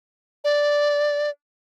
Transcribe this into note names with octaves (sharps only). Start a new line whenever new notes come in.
D5